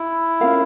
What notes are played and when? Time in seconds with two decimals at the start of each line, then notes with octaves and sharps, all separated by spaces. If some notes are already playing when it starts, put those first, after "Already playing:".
Already playing: E4
0.40 C#4 F4 A#4 F5